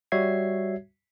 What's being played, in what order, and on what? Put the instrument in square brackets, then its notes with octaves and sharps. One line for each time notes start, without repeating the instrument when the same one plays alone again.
[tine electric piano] G3 F#4 C#5 E5 G#6 C7